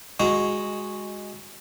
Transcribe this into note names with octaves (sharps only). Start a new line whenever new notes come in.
G#3 F#4 A#5